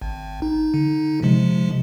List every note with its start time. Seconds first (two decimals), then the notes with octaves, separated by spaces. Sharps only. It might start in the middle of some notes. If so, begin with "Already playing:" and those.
0.02 G#1
0.42 D#4
0.71 D3 D#4
1.22 C3 F3 G#3